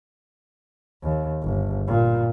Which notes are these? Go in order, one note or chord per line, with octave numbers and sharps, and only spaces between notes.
D#2
G1
A#2